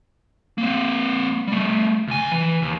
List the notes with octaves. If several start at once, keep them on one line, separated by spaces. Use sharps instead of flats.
A#3 C4
G3 A3
D2 G#5
E3
D#2